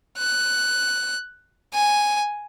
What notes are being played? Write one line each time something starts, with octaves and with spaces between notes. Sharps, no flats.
F#6
G#5